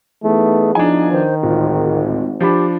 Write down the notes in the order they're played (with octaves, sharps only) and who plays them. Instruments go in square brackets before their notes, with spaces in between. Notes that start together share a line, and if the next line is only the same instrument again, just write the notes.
[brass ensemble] E3 B3 D#4 [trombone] A3 [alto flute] G#4
[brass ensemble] E2 F3 [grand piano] D4 G#5 [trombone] D#4
[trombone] D#3 [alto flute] C5
[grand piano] D1 [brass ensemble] G#1 [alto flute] F4
[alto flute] F4
[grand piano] F3 D4 B5 [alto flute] G4